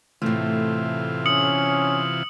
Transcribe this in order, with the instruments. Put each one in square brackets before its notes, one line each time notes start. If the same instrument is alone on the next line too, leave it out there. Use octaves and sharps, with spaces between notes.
[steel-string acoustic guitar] A2 A3 [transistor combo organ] C3 E3 F4
[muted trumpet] C#4 [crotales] D#6 C#7 F#7